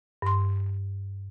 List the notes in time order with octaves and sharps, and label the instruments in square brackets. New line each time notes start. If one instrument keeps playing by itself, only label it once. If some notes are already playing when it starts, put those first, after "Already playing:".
[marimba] G2 C6